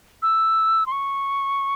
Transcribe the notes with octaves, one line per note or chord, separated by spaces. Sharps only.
E6
C6
C#6